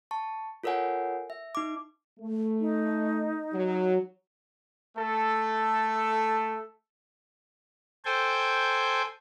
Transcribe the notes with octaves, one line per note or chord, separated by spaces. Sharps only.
A5 C#6
F4 A4 A#4 C#5 F#5 G#5
E5
D#4 D6
A3
D#4
F#3
A3 A4
A4 C5 G5 G#5